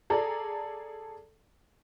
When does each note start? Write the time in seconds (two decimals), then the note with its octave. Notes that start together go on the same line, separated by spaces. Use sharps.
0.10 G#4 A4 D5 A#5